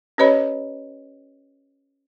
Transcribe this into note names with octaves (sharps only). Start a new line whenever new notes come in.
C#4 G4 B4 C#5 D#5 B5